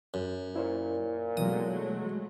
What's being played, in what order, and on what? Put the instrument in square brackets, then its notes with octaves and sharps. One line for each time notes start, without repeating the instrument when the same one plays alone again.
[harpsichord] F#2
[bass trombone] A#2 [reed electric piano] E4 C5 C#5
[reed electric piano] B2 E3 [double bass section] F#3 G#3 A3 [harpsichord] D#6